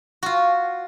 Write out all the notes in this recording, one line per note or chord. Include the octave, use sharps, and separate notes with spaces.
F4 F#4